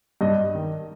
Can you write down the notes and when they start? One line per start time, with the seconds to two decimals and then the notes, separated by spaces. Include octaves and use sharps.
0.21 G2 D#5
0.55 D#3